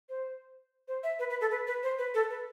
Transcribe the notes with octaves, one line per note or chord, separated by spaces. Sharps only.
C5
C5
E5
B4
B4
A4
B4
B4
C5
B4
A4
B4